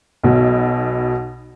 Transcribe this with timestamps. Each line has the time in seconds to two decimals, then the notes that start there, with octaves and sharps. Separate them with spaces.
0.24 B1 B2